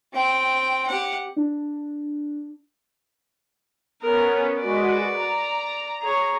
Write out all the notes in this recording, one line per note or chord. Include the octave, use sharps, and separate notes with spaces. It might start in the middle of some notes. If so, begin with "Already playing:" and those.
C4 G5
G4 F#5
D4
B3 C#4 A#4
G#3 F#4 B4 D5
A#5
G#4 C#5